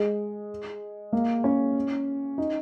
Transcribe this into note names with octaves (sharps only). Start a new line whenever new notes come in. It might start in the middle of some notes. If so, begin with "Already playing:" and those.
Already playing: G#3
A#3
C#4
D#4